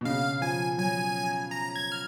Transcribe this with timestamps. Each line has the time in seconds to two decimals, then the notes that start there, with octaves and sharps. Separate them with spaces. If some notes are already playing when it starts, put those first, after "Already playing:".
0.01 B2
0.05 C#3 F5
0.41 F3 G#5
0.78 F#3 G#5
1.51 A#5
1.76 G#6
1.92 F6